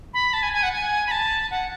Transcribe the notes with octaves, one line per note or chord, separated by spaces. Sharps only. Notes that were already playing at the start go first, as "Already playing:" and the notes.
B5
A5
G#5
G#5
F#5
G#5
B5
A5
F#5